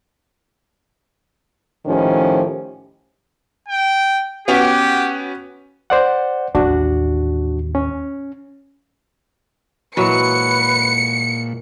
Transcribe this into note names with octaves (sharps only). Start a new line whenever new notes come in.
A2 D#3 F3 C#4 G4 C5
G5
B3 C#4 F#4 G4
C5 D5 F#5
A1 D#2 D4 F#4
C#4
A#2 E3 F#3 G#3 B4 C#7